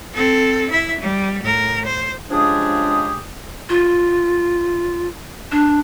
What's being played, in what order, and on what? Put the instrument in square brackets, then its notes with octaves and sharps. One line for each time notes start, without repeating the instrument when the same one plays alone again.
[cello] C4 A4
E4 E5
G3
A2 A#4
C5
[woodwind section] C#3 F3 G#3 D4 G4 G#4
[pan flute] F4
D4